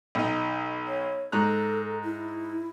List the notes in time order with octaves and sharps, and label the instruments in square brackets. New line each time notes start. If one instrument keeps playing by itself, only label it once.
[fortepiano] B1 D#4
[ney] C#5
[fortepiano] G#2 A#5 F#6 [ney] A4
[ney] E4